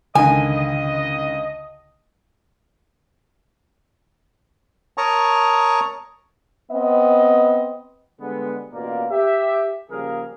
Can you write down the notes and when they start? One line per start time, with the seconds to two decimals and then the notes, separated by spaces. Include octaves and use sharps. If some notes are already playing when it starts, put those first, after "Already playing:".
0.15 C#2 D3 D#3 D#5 G#5
4.98 A#4 C#5 A5 A#5 C#6 D#6
6.72 B3 C4 D#5
8.20 D3 G3 G#3 B3
8.72 A1 B2 A#3 F4 A#4 D5
9.10 G4 E5
9.89 C#3 F3 G3 A#3 G#4 A#4